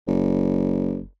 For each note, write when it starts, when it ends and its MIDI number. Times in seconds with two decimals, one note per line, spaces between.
0.08 1.04 30